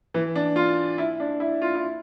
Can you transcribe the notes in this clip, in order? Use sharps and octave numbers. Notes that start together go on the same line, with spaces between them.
E3
D4
F4
E4
D4
E4
F4
E4